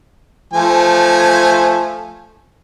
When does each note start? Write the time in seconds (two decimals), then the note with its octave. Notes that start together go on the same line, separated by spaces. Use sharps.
0.53 F3 A3 G#5